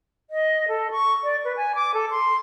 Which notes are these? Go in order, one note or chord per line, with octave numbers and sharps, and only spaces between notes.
D#5
A4
C#6
D5
B4
G#5
D6
A4
C6